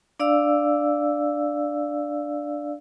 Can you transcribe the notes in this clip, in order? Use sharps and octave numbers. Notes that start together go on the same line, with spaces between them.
D4 D5 F5 E6